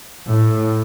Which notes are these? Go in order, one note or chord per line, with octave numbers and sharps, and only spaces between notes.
A2